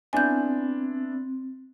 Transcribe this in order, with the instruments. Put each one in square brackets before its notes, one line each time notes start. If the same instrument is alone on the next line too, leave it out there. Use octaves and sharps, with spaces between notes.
[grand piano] B3 D4 E4 [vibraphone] C4 [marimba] G#5 G6